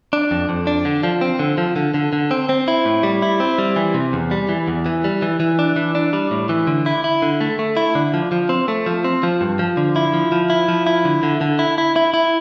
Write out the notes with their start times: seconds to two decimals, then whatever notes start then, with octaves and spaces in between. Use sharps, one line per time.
0.13 D4
0.31 F2
0.49 F2
0.67 D4
0.85 D3
1.03 F3
1.21 C4
1.39 D3
1.58 F3
1.76 D3
1.94 D3
2.13 D3
2.31 C4
2.49 C4
2.68 E4
2.85 A2
3.03 G3
3.22 E4
3.40 C4
3.58 G3
3.76 E3
3.94 C3
4.13 E2
4.31 G3
4.49 E3
4.68 E2
4.86 E3
5.04 G3
5.22 E3
5.40 E3
5.59 D4
5.76 E3
5.95 D4
6.13 G3
6.31 A2
6.49 E3
6.67 D3
6.86 E4
7.04 E4
7.22 D3
7.41 A3
7.59 A3
7.77 E4
7.95 D3
8.14 F3
8.32 F3
8.49 C4
8.68 A3
8.86 F3
9.04 C4
9.23 F3
9.41 G2
9.59 F3
9.77 D3
9.96 E4
10.14 F3
10.32 F3
10.50 E4
10.68 F3
10.87 E4
11.05 D3
11.23 D3
11.41 D3
11.59 E4
11.78 E4
11.96 E4
12.14 E4